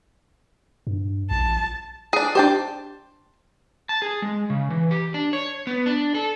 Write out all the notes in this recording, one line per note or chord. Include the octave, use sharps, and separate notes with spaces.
G2
A#1 A5
D4 G#4
D4 G4 C5 G5 A5
A5
G#4
G#3
C#3
E3
G4
D4
C#5
B3
D4
A4